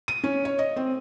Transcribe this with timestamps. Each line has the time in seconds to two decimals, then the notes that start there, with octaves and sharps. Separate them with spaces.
0.08 D#7
0.24 C#4
0.45 C#5
0.59 D#5
0.76 C4